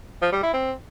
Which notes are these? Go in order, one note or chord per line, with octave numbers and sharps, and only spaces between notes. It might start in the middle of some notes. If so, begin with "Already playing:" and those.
F3
G3
E4
C4